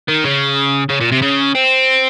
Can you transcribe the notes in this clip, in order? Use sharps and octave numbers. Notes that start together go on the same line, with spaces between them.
D#3
C#3
C#3
A#2
C3
C#3
C4